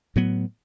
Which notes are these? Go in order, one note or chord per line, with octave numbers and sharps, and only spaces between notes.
A2 F#3 B3